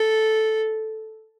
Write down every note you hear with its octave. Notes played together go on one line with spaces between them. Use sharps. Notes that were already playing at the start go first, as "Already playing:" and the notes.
Already playing: A4